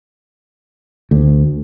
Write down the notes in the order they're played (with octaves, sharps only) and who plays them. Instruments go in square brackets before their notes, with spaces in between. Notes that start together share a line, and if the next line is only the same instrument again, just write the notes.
[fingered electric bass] D2